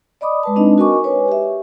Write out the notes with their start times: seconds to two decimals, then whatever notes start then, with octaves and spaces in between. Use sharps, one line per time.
0.21 D5 D#5 B5 D6 D#6
0.43 G#3 B4 A5
0.56 G#3 C4 D4 D#4 D#5
0.78 F#4 A#4 D#5 G#5 C#6 D6
1.04 B4 C#5 G#5
1.28 G4 E5